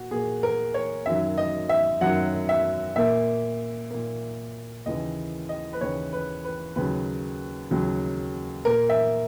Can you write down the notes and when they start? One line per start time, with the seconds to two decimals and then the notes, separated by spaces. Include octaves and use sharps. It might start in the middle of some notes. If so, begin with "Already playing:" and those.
Already playing: A#2 F#4
0.11 A#2 A#3 G#4
0.43 A#4
0.74 C#5
1.06 F#2 D#3 F#3 E5
1.38 D#5
1.69 E5
2.01 F#2 D#3 F#3 F#5
2.49 E5
2.96 A#2 A#3 E5
3.91 A#2 A#3
4.86 D#2 C#3 E3 D#5
5.49 D#5
5.73 B4
5.81 D#2 C#3 E3 C#5
6.13 B4
6.44 B4
6.76 D#2 C#3 F#3 B4
7.71 D#2 C#3 F#3
8.65 A#2 A#3 A#4
8.89 E5